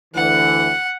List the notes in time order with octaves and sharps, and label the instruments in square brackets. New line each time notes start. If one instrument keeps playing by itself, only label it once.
[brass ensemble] D2 D3 E3 [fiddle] F#5